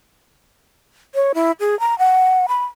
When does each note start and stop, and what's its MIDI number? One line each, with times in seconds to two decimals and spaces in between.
1.15 1.32 73
1.34 1.52 64
1.60 1.78 68
1.80 1.97 82
1.99 2.46 78
2.48 2.64 83